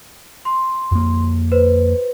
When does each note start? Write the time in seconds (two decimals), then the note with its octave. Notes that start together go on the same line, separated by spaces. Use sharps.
0.45 C6
0.92 F2 A#3
1.52 B4 C5